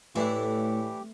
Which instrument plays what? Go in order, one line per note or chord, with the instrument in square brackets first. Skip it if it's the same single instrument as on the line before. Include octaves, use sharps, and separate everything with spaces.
[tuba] A2 [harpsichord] E3 D4 E4 [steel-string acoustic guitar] A3 [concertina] G4